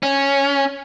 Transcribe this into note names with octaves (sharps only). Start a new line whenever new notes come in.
C#4